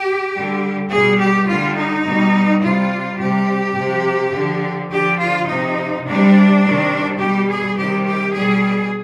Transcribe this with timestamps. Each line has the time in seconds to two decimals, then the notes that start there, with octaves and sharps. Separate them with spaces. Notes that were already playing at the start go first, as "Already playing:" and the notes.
Already playing: G4
0.33 D3 G3
0.91 B2 G3 G#4
1.18 G4
1.47 D3 G3 F4
1.76 D#4
2.05 B2 G3
2.62 C3 G3 F4
3.19 C3 G3 G4
3.76 C3
3.81 F3
4.33 D3 F3
4.90 D3 F3 G4
5.19 F4
5.47 C3 F3 D#4
6.05 C3 G3 D4
6.63 C3 D#3 G3
7.19 B2 G3 G4
7.48 G#4
7.77 C3 D#3 G3 G4
8.05 G4
8.34 B2 G3 G#4